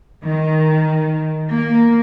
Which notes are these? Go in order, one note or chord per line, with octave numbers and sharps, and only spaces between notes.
D#3
A#3